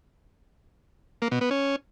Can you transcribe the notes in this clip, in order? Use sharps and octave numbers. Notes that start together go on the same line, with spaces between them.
A#3
B2
B3
C#4